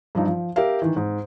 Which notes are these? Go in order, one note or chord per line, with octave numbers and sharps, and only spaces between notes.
G2 F3 D#4
F3
G4 A#4 E5 F5
D#3 E3
G#2